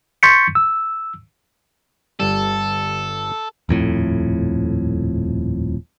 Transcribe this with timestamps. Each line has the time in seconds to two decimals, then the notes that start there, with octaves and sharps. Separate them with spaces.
0.23 C6 C#6 G6 A6 B6 C#7
0.55 E6
2.20 G1 G3 A4
3.69 D#1 F2 A2